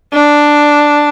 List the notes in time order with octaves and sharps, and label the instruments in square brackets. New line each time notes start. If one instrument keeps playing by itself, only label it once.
[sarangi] D4